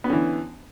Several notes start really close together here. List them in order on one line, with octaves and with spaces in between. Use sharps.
B3 C#4 D3 E3